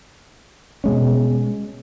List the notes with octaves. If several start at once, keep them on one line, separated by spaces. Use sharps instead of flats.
B2 G#3 C#4